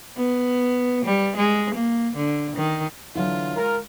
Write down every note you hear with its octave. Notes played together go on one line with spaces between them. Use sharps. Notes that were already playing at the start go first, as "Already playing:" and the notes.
B3
G3
G#3
A#3
D3
D#3
D3 E3 F#3 F4 E5 F#5
G#3 A#4